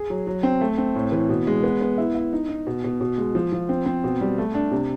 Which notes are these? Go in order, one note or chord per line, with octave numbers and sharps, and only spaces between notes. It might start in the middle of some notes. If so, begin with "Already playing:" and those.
Already playing: G#4
F#3
F#3
C4
A3
C4
A2
E3
B2
G#3
B3
B3
E4
E4
D#4
D#4
B2
B2
B2
G#3
F3
F3
C4
C4
B2
G3
A3
D4
C3